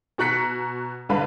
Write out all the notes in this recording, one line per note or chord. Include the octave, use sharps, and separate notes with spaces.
B2 F#4 A#5 F#6 B6 C#7
C2 G2 D3 B4 F5 B5